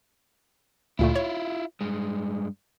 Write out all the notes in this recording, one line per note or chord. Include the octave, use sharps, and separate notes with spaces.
D2 A#2 A3 E4 F4
C#5
G2 G#3